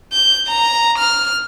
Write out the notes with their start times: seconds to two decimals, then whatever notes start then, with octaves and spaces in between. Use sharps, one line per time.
0.12 G6
0.47 A#5
0.98 F6